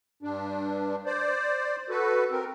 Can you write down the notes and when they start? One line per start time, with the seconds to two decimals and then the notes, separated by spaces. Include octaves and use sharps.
0.23 G2 D4
1.06 C5 D5
1.90 F#4 A4 B4
2.31 C4 A#4